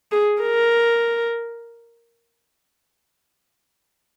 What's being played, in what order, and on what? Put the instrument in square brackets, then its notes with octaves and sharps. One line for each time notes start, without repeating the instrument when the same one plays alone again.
[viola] G#4
A#4